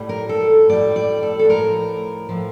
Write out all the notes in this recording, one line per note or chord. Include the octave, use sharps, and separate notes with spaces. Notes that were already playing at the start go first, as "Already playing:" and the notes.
Already playing: A2 G3
A#4
A4
A2 G3 D5
D5
A4
A4
A2 F3 A#4
A2 F3